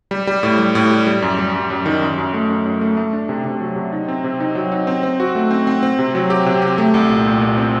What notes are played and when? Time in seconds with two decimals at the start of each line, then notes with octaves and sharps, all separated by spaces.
0.11 G3
0.27 G3
0.43 A2
0.58 G3
0.75 A2
0.91 G3
1.07 G3
1.22 F#2
1.39 G3
1.55 F#2
1.70 F#2
1.86 D#3
2.02 F#2
2.18 F#2
2.33 A3
2.49 F#2
2.65 F#2
2.81 A3
2.97 A3
3.13 D4
3.29 C3
3.44 C3
3.61 F#3
3.76 C3
3.92 D#4
4.08 C4
4.24 C3
4.40 D#4
4.55 F#3
4.72 D#4
4.87 C4
5.03 C4
5.20 F#4
5.35 A3
5.51 C4
5.67 C4
5.83 C4
5.99 C3
6.15 F#3
6.30 G4
6.46 C3
6.62 G4
6.78 A3
6.94 C2
7.10 A#2
7.26 A#2
7.41 A#2
7.57 C4